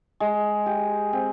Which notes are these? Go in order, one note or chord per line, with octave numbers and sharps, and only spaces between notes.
G#3
G4
C4